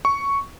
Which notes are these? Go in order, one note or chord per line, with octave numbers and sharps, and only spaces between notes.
C#6